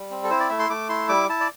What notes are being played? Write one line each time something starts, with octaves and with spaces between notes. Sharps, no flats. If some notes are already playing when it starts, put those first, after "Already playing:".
Already playing: G3
C4
A4
E4 C5
D5
A3 E5
C6
A3 D6
E4 C6
G3 D6
E4 A5
D5